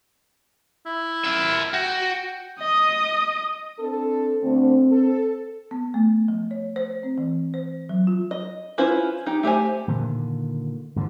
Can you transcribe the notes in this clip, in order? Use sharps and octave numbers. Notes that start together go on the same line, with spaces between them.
E4
A#4 E5
F#4 G5
D#5 D#6
C4 D4 A4
D2 A3 C4 D4
A4
B3
A3
F3
C#5
C5
C4
E3
C5
F#3
F4
D#5
C#4 E4 F4 B4 C5
D#4 G4
A3 G4 C5 G#5
A#2 D3 D#3
G#2 D3 E3 F3